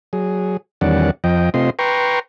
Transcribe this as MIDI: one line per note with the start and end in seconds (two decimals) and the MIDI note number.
0.13 0.57 54
0.13 0.57 68
0.81 1.11 40
0.81 1.11 51
0.81 1.11 55
0.81 1.11 61
0.81 1.11 74
0.81 1.11 78
1.24 1.50 41
1.24 1.50 53
1.24 1.50 75
1.24 1.50 79
1.54 1.70 48
1.54 1.70 57
1.54 1.70 60
1.54 1.70 65
1.54 1.70 75
1.54 1.70 84
1.79 2.19 71
1.79 2.19 79
1.79 2.19 82
1.79 2.19 84
1.79 2.19 85